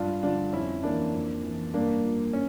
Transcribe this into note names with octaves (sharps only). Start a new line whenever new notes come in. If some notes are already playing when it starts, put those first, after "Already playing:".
Already playing: G2 D4 F4
D3 F3 D4 F4
F2 C#4 E4
E3 A#3 D4
F2
E3
G2 A#3 D4
F3
C#4